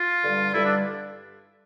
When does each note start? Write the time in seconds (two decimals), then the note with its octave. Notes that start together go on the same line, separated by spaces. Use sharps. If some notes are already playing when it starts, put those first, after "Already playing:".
Already playing: F4
0.22 G2 D3 G3
0.54 G2 D3 G3 E4
0.64 D4